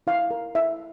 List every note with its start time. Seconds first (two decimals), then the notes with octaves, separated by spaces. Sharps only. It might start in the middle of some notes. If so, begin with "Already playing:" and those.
0.07 E4 F5
0.31 A#4
0.55 E4 E5